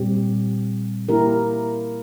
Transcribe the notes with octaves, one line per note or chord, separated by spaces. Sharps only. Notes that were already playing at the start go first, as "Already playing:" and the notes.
Already playing: A#2 G3 C4 G4
A#3 E4 G4 A#4